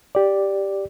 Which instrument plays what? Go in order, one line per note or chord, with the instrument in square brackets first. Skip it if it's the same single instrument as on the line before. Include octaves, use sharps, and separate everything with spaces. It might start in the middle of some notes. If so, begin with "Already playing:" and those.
[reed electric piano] G4 D5